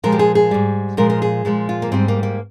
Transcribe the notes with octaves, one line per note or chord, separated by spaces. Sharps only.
A#2 F3 G#3 A#4
G4
G#4
G#4
G#2 G3
A#2 F3 G#3 A#4
A#4
G#4
A#2 F3 G#3
F4
A#3
G#2 G3 C4
A#3
A#3